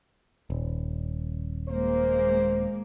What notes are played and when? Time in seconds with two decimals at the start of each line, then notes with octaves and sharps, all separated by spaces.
0.50 D#1
1.68 G#3 A#3 C5